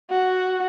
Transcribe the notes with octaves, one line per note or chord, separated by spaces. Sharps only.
F#4